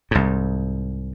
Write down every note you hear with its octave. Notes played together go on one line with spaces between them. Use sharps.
C2 G#2